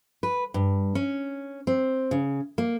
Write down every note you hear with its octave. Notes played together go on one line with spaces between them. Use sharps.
B4
G2
C#4
C4
C#3
A#3